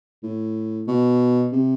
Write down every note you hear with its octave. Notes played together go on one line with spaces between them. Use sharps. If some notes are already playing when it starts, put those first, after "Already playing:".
A2
B2
C3